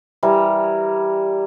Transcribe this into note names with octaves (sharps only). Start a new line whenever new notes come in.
E3 G3 A#4